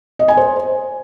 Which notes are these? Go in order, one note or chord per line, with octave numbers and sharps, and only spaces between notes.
D#5
G#5
C5